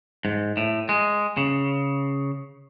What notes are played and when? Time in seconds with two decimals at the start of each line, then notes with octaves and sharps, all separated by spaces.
0.25 G#2
0.57 A2
0.89 G#3
1.37 C#3